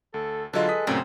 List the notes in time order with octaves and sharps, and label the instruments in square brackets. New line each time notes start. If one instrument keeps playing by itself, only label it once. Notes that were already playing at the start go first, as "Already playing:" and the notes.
[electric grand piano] D2 [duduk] A4
[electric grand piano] D3 F#3 F4 [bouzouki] G#3 B4 [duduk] A4
[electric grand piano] D#6 B6
[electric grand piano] F#2 C#3 A3 [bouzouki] A#2 B3 [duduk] C4